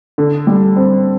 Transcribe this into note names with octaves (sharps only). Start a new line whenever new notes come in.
D3
G3
C4